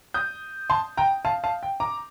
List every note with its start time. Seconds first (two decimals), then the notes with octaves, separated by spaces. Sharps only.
0.14 D#6 G6
0.70 A5 C6
0.97 G5 A#5
1.25 F5 A5
1.44 F5 A5
1.63 G5
1.80 A#5 D6